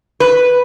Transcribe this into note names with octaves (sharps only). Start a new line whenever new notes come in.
B4